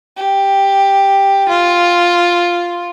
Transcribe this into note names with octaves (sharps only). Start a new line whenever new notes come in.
G4
F4